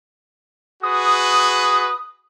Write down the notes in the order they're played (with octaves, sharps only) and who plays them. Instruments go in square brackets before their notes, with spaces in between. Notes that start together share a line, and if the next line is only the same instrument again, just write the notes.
[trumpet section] F#4 G#4 B4 [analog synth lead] D#6